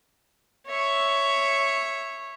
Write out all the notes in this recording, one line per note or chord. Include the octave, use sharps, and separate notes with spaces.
C#5 E5